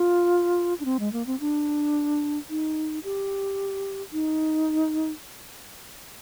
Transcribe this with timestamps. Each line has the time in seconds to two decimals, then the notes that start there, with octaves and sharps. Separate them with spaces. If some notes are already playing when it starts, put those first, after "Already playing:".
Already playing: F4
0.80 D4
0.85 C4
1.00 G#3
1.13 A#3
1.26 C4
1.40 D4
2.50 D#4
3.04 G4
4.13 D#4